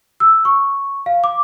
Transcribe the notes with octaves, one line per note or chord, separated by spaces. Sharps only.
E6
C#6
F5
D6